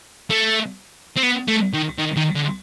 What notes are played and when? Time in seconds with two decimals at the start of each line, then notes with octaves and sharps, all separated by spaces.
0.30 A3
1.16 C4
1.23 B3
1.48 A3
1.73 D#3
1.98 D#3
2.17 D#3
2.35 D3